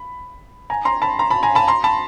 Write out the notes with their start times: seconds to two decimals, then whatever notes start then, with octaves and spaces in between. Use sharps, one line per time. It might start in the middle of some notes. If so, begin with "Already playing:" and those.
Already playing: B5
0.70 G#5 A#5
0.85 A#5 C6
1.02 A5 B5
1.19 A#5 C6
1.30 A5 B5
1.43 G#5 A#5
1.55 A5 B5
1.68 A#5 C6
1.84 A5 B5